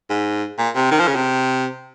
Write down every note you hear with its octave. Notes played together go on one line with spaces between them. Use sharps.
G#2
A#2
C3
D#3
F3
C#3
C3